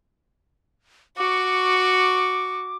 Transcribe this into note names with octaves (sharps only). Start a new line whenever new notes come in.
F#4 C#6 D6